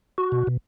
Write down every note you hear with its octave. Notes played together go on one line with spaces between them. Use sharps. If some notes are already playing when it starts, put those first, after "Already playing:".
F#4
B2
B2